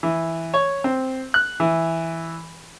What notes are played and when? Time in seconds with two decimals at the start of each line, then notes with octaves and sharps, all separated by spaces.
0.03 E3
0.54 C#5
0.84 C4
1.34 F#6
1.60 E3